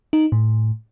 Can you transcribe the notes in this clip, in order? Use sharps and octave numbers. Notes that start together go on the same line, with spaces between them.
D#4
A2